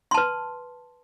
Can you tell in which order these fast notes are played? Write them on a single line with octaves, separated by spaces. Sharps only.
C6 A5 B4